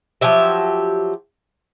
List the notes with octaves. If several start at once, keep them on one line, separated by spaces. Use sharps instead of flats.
F3 F#3 G4 E5